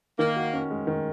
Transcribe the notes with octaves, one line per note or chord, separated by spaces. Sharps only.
D#3 A#3
F#4
C#4
G#3
D#3